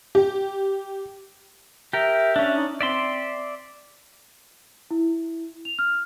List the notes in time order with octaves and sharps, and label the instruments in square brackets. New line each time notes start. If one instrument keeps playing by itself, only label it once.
[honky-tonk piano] G4
[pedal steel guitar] G4 A#4 [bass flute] E5
[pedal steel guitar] C#4 D4
[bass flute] D#4
[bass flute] C4 [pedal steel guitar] D5 E5 C6
[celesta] E4
F7
F6